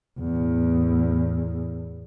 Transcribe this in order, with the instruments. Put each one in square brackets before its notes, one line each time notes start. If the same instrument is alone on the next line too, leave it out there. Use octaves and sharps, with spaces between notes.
[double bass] E2 A2